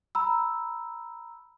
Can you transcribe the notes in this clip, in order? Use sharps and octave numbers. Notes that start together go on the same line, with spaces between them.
A#5 B5 E6